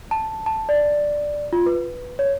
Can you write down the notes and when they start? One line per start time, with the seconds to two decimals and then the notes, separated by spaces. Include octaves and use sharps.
0.11 A5
0.46 A5
0.69 D5
1.53 F4
1.66 B4
2.19 C#5